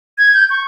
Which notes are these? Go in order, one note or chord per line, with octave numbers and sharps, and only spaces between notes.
G#6
G6
C#6